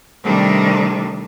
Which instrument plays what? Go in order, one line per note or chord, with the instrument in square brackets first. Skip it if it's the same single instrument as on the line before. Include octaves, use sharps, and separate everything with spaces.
[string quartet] C3 D#3 G3 A3 C4 D4